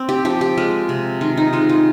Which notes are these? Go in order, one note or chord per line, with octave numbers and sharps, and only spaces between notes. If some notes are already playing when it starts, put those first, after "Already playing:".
Already playing: C4
G4
F3 G4
G4
G#3 F4
C3
D#3 F4
D#4
G#3 F4
F4